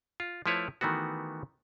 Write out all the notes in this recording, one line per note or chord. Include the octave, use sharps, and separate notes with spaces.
F4
F3 A3 E4 B4 C#5
D#3 E3 A3 B3 F#4